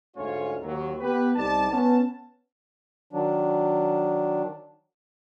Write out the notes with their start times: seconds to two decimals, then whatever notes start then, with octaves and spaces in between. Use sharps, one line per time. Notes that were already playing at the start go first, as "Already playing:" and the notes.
0.16 D2 G#2 A3 C#4 F4 C#5
0.63 D#2 F#3
1.00 B3 G4 B4
1.36 C2 G3 D#4 D5 A5
1.70 B3 C#4 A5
3.13 D#3 F#3 D4